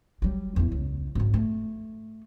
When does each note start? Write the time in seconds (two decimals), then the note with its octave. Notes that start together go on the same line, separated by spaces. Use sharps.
0.22 F#3 G3
0.56 E2 E4
0.72 C#2
1.15 G#1 F#2
1.34 A3